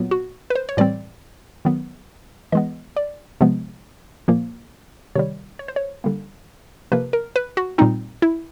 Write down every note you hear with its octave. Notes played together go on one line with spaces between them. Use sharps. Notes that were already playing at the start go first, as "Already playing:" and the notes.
Already playing: A#2 F#3 B3
F#4
B4
C5
C#5
A2 E3 G3 C4 D5
D#3 F#3 B3
E3 G#3 B3 D#5
D5
C3 F3 G#3 B3
A#2 F3 A#3
C3 D#3 G3 C#5
C#5
C5
C#5
D3 G3 A#3
C3 F3 A#3 B4
A#4
B4
F#4
A#2 G3 C4 D#4
E4